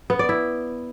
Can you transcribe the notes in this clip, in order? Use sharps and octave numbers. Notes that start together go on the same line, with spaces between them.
B3
D5
E4